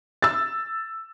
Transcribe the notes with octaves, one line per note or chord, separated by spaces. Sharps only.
E6 A6